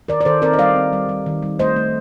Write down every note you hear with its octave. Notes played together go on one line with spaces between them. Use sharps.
D#3 A#4 D5
D5
D#3 A4 C5
C4 A#4 D5
D#5
G3 D5 F5
C4
G3
G3
D#3
G3
A3 C5 D#5
A3